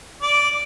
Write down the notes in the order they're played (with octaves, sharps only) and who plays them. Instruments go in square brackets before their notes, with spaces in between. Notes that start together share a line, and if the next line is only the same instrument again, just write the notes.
[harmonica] D5